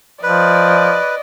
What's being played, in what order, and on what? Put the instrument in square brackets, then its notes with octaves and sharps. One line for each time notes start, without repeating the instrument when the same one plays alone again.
[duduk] F3 [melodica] B4 [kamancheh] D5 D#5